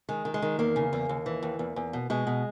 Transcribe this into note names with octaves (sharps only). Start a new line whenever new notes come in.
D#3 G#3
D#3
G#3
D#3
E2 A#3
C#3
E2
D#2
E3
D#2
E2
E2
B2
B2 G#3
B2